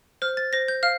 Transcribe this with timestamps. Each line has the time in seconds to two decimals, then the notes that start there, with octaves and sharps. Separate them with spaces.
0.22 C5 F6
0.37 A6
0.53 C5 A#6
0.68 G6
0.83 F5 F6